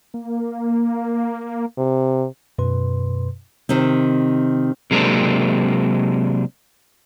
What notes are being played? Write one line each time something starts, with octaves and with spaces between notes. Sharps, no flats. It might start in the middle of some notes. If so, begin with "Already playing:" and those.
A#3
C3
F#2 B2 B4 C6
C3 D#3 C4
C3 F#3 G#3 A#3 C4 D4